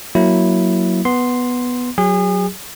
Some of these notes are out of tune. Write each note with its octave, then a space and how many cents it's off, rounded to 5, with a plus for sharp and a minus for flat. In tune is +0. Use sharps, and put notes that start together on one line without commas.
F#3 +0 A#3 +0 E4 -5
B3 +0 C6 +0
F#3 +0 G#4 -35